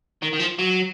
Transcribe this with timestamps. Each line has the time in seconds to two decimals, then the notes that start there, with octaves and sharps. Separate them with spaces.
0.22 D#3
0.33 D#3
0.39 F3
0.59 F#3